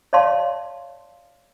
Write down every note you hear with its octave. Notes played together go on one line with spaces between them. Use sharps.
C#5 D5 F5 A5 C6